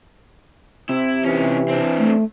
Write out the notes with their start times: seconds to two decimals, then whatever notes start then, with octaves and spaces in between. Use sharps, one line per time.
0.89 C3 E4
1.25 E3 C#4 D#4
1.68 C4 D4
1.99 A3